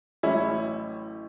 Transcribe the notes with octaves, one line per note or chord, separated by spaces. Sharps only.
A1 A2 F#3 C#4 E4